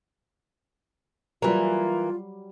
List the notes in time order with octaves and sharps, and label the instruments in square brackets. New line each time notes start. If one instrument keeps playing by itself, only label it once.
[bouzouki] E3 A#3 [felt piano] F#3 G3 D5 [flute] F4